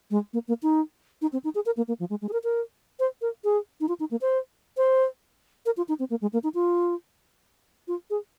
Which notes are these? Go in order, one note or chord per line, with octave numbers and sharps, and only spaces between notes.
G#3
A#3
A#3
D#4
D#4
C4
D#4
G#4
A#4
A#3
A#3
F3
G#3
G#3
G#4
A#4
A#4
C5
A#4
G#4
D#4
F4
D#4
A#3
C5
C5
A#4
F4
D#4
C4
A#3
G#3
A#3
D#4
F4
F4
G#4